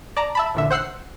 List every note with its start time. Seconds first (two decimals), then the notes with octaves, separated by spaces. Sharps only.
0.17 D5 A5 A#5
0.35 E5 A5 B5
0.55 A1 A#2 D3 E5
0.71 C5 F#5 E6 F#6 C7